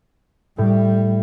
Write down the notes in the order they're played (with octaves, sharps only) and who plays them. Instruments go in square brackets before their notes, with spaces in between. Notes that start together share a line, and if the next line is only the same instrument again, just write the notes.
[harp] A2 [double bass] G3